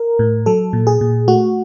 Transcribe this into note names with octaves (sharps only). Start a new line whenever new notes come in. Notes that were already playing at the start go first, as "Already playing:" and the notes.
Already playing: A#4
A2
F#3 A4
A#2
G#4
A#2
A3 F#4